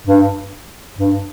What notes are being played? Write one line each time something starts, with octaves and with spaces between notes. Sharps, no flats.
G2
G2